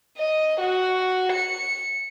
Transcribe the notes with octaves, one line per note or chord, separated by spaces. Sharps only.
D#5
F#4
C#7